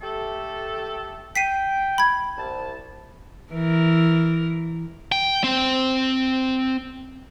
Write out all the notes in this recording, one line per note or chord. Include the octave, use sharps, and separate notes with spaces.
A3 G4 A4
G5 B6 C7 D#7
B5 G#6
C2 A5
E3 A#4
G5
C4